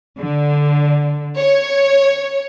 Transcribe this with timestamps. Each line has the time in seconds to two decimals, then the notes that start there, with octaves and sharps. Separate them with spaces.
0.17 D3
1.37 C#5